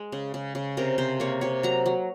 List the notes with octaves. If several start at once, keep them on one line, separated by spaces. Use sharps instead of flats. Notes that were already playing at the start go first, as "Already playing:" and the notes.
Already playing: G#3
C#3
C#3
C#3
C3 A#4
C3 C5
A#3 C#5
C3 C#5
F#3 A#5
F#3